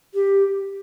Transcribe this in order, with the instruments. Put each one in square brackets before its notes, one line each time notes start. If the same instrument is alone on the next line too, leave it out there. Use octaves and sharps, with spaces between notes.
[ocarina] G4